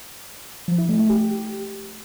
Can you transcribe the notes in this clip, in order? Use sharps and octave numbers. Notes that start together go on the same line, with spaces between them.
F3
E4
A3
A3
G4